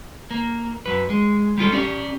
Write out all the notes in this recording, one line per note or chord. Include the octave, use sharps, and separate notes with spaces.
A#3
F#2 B4
G#3
G3 G#3 F4 A4
C#4 G4 D5